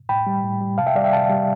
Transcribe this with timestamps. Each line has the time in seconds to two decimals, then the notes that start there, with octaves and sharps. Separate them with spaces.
0.09 A2 G5 B5
0.27 G3
0.44 A2
0.61 G3
0.78 C3 F5 A5
0.87 E5 G5
0.95 G3 D5 F5
1.04 E5 G5
1.13 C3 F5 A5
1.30 G3